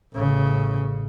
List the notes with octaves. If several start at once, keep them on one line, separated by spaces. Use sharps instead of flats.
A1 C#3